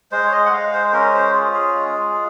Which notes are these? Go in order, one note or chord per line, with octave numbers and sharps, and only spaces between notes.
G#3 C5
C#5
D#5
F#5
G#3 F5
C5
C5
C#4 A#4
C5
F4 G#4
G#4
G#3
G#3